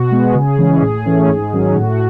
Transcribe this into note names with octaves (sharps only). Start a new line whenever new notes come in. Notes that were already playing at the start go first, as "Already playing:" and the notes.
Already playing: B2 F#4
G#3 B3
C#3 G#4
E3 G#3 C#4
A2 G#4
E3 A3 C#4
G#2
D#3 F#3 C#4
A2 F#4